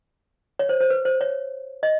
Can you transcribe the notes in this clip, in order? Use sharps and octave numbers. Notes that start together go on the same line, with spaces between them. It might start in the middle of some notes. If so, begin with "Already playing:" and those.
C#5
C5
C5
B4
C5
C#5
D#5